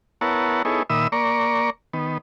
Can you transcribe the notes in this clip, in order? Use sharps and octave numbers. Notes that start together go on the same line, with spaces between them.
B3 E4 A#4 C#5 F#5 A5
B3 D#4 E4 G#4 A4 C#5
A#2 D#3 E5 B5 D#6 E6
A#3 D5 A#5 C#6
D#3 B3